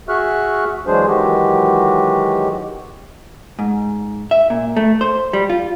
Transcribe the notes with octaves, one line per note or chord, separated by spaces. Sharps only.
F#4 G#4 E5 C#6 F6 F#6
E3 F#3 G#3 D4 G#4 C5
D#3 E3 F#3 G#3 F#4 G4
G#2
E5
A#2
A3
C5
G3
F4